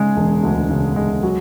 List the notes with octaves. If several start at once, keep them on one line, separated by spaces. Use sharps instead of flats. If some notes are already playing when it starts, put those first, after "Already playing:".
Already playing: C#3 G#3 G#4
E1
D2
C#3
G#3
F#3